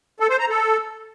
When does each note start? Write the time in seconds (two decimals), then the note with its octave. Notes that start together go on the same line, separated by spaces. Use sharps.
0.20 A4
0.30 C5
0.40 A#5
0.49 A4